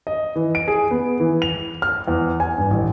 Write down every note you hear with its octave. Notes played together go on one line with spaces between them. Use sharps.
D#5
E3
D7
G#4
B3
E3
F7
F6
E2
G#5
G2
A1